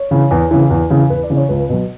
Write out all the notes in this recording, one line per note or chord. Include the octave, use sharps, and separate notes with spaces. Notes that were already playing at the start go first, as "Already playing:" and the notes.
Already playing: C#5
C#3 E3
E2
C#3 E3
E2
C#3 E3
E2 B4
D5
C#3 E3
C#5
C#2 B4
B2 F#3